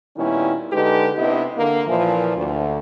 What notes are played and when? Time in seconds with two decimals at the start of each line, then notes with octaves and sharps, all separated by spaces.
0.17 A#2 D#3 G3 B3 C#4 E4
0.72 D3 G#3 D#4 G4 A4 B4
1.17 C3 B3 D4 E4 D#5
1.58 D3 A#3
1.87 A#2 E3 F3
2.37 D2